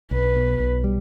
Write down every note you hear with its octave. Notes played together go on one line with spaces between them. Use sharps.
B1 B4
B2
B1
G3